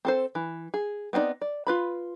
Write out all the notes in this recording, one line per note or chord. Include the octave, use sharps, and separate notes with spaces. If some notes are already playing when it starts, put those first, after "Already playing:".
C4 A4 C5
E3
G#4
B3 C4 D4 D#4 D5
D5
F4 B4 B5